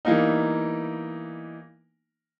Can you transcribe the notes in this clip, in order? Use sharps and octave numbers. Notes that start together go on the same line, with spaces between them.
E3 G3 A#3 B3 D#4